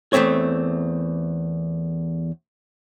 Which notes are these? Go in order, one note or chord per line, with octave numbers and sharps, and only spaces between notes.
E2 G#2 A3 C4 C#5